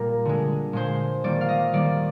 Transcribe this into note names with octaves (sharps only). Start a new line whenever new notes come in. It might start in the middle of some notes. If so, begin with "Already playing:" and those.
Already playing: A#2 G3 A#3 A#4
D3 G#3
A#2 G#3 C5
D#3 G3 A#3 D5
F5
D#5
D#3 G3 A#3 D5